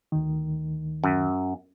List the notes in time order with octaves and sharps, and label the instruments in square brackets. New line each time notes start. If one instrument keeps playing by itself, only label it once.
[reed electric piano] D2 D#3
[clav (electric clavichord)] F#2